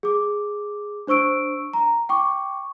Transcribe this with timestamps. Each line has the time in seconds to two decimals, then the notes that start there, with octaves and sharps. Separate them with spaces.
0.03 G#4 D6
1.07 D4 C5 C#6 E6 D7
1.73 A#5
2.09 G5 C#6 D6